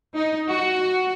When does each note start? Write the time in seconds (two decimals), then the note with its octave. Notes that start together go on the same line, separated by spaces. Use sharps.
0.15 D#4
0.50 F#4